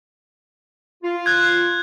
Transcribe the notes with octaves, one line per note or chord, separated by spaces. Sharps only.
F4
F#6 G#6